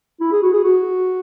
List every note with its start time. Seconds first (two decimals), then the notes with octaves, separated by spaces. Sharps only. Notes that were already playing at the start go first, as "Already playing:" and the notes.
0.21 E4
0.32 G#4
0.43 F#4
0.53 G#4
0.64 F#4